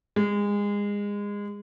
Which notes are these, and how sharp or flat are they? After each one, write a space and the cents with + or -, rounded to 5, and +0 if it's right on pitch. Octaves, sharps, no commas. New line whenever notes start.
G#3 -25